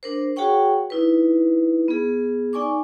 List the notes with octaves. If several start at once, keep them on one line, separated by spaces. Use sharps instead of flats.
D4 A#4 C5
F#4 G#4 C#5 F#5 G5 C#6
D#4 E4 B4
B3 G#4
D#4 D5 G#5 C#6 D6